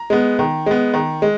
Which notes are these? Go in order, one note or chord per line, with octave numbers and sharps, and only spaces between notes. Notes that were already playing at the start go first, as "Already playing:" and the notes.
Already playing: A#5
G#3 B3
D#3
G#3 B3
D#3
G#3